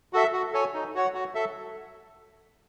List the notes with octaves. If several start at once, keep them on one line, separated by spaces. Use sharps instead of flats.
F#4 A4 E5
F#4
A4 C#5 G#5
D#4
F#4 C#5 F#5
F#4
A4 E5